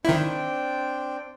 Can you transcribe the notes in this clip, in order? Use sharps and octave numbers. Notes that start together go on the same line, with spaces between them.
D#3 C4 D4 E4 G5